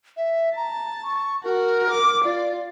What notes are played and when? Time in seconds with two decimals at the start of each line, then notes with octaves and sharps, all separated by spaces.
0.17 E5
0.57 A5 A#5
1.03 C#6
1.44 F#4 A#4
1.90 D6
2.24 F4 D5